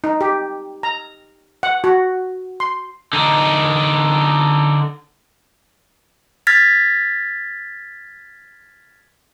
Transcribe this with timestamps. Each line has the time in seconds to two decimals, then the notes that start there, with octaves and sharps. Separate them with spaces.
0.04 D#4
0.21 G4
0.83 A#5
1.63 F#5
1.84 F#4
2.60 C6
3.13 D3 D#4
6.47 F6 G#6 A6 B6